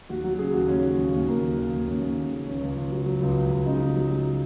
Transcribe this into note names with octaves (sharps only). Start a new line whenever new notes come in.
D#2 F#4
F#3 F#4
C#3 G#4
D#2 F#4
D#2 C#4
C#3
D#2
D#2
D#2 A#3
D#2
D#2
D#2
D#2 C#4
D#2
C#3
C#3
C#2 C#4
C#2
C#2
F#3
F#3
C#2
C#2
C#2
C#3 D#4
C#3
F#3
F#3